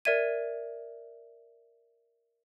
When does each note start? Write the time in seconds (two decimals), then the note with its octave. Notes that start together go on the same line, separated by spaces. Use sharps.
0.05 A#4 D5 E5 G#6 D#7